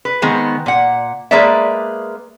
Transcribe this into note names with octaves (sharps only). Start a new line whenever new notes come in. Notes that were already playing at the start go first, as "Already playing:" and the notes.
B4
D#3 G#3 B3 C4
A#2 F#5
G#3 A#3 G#4 B4 D5 E5